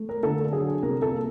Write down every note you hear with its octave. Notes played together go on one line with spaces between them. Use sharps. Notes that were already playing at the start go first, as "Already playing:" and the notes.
Already playing: A3
A#4
D3 A4
F#3 G#4
C2 A#4
A4
A#3